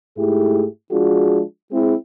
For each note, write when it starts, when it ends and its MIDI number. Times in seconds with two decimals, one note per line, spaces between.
0.17 0.66 44
0.17 0.66 57
0.17 0.66 64
0.17 0.66 67
0.17 0.66 68
0.91 1.42 53
0.91 1.42 56
0.91 1.42 62
0.91 1.42 65
0.91 1.42 66
0.91 1.42 68
1.72 1.94 56
1.72 1.94 60
1.72 1.94 64
1.72 1.94 68